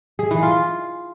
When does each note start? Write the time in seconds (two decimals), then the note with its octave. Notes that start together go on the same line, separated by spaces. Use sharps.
0.19 G#4
0.31 E3
0.43 F4